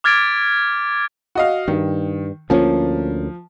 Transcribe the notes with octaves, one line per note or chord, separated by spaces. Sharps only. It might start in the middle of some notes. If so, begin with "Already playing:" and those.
D6 F6 G#6 A6 B6 D7
F#4 D#5 F5
G2 D#3
D2 F3 A#3 C#4